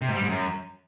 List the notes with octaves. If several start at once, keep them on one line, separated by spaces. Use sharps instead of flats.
C3
G#2
G3
G#2
F#2